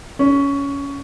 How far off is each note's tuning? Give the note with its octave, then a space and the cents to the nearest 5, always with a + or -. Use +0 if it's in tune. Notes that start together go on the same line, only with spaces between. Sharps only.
C#4 +15